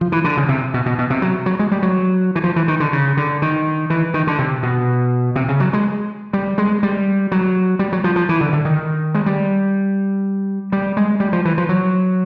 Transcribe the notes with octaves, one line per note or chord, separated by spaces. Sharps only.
F3
E3
D3
C#3
C3
B2
B2
B2
C3
F#3
F#3
G#3
G3
F#3
E3
F3
E3
D#3
D3
C#3
D3
D#3
E3
D#3
D3
C3
B2
C3
C#3
F#3
G#3
G3
G#3
G3
F#3
G3
F#3
F3
F3
E3
D3
D3
D#3
G#3
G3
G3
G#3
G3
F3
E3
F3
F#3